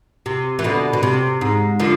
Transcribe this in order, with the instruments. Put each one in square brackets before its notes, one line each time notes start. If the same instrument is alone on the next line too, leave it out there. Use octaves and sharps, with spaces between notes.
[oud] C3
E3
B2 D3
B2
C3
G#2
D3 F3